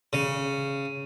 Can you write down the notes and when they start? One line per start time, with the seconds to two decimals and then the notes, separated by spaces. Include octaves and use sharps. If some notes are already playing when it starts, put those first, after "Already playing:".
0.13 C#3